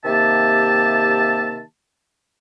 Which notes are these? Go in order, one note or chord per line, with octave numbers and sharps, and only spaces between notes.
C3 D#3 A#3 G4 E5 A5